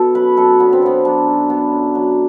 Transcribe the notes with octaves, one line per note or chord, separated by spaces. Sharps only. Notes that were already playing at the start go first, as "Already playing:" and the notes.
Already playing: B2 A4
F#2 B4
F#2 A4
D3 B3
C4
F#2 B3
F#3 D4
F#2
D3 B3
F#2
F#3